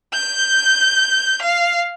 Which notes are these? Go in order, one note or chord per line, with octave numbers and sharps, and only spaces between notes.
G6
F5